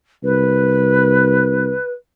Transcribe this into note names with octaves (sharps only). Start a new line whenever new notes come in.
C2 B4